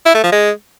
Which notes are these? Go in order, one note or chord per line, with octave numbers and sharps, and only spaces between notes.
E4
A3
F3
G#3